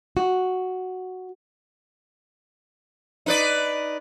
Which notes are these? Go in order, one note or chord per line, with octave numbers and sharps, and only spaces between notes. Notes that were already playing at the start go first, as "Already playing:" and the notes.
F#4
D#4 B4 D5